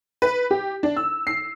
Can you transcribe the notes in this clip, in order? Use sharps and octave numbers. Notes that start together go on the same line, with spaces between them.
B4
G4
D4
E6
C7